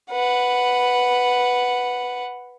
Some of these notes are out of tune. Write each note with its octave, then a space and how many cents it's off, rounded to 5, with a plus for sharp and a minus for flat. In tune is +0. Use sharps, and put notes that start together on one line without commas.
B4 +0 F#5 +0